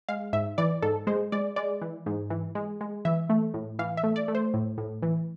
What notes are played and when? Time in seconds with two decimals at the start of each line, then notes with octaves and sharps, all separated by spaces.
0.09 G#3 F5
0.33 G#2 E5
0.58 E3 D5
0.82 G#2 A4
1.07 G#3 C5
1.32 G#3 D5
1.56 G#3 D5
1.82 E3
2.06 G#2
2.30 E3
2.55 G#3
2.81 G#3
3.05 E3 E5
3.30 A3
3.54 A2
3.79 E3 F5
3.97 E5
4.04 A3
4.16 D5
4.28 A3
4.35 C5
4.54 A2
4.78 A2
5.03 E3